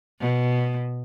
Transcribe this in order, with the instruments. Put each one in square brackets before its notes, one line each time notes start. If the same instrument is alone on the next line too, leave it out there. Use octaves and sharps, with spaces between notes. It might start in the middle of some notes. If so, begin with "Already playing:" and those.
[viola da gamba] B2